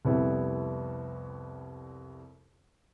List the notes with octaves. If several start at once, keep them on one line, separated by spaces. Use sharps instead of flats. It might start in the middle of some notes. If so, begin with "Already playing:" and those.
C2 F2 G3 B3 E4